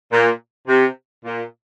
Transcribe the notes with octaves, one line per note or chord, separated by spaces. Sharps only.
A#2
C3
A#2